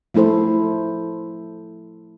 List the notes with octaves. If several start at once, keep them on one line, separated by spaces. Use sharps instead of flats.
F3 A3 E4 A4 C5